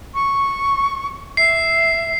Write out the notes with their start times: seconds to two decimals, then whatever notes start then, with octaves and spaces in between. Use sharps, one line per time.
0.14 C#6
1.37 E5 C7